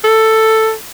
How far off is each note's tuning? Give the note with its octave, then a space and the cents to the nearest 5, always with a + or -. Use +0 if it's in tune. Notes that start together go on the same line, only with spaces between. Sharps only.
A4 +5